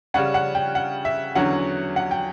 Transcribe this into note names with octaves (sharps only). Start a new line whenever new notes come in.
C#3 G3 C#4 F#5
F#5
G5
F#5
E5
E2 D3 F#3 C#4 F#5
F#5
G5